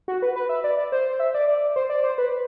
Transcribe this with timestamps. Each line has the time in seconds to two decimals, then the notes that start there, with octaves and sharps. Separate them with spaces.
0.08 F#4
0.22 B4
0.36 B4
0.49 E5
0.64 D5
0.78 D5
0.92 C5
1.20 E5
1.34 D5
1.48 D5
1.76 C5
1.90 D5
2.04 C5
2.18 B4